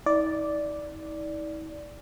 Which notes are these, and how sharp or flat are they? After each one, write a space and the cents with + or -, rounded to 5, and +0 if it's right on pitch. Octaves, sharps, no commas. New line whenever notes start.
D#4 +45 D5 -5